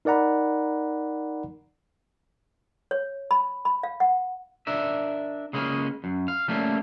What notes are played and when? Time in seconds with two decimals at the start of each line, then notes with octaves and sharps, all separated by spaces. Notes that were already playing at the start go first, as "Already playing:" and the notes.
0.05 D#4 A#4 D5 F#5 A#5 B5
2.91 C#5
3.31 B5
3.65 B5
3.83 F5
4.00 F#5
4.67 D4 A#4 E5
5.53 C#3 G#3 A#3 C#4
6.04 F#2
6.28 F5
6.48 G3 A3 A#3 C#4